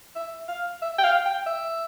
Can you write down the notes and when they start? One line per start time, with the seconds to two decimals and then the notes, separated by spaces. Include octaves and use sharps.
0.16 E5
0.48 F5
0.82 E5
0.99 G5
1.04 F5
1.26 G5
1.47 E5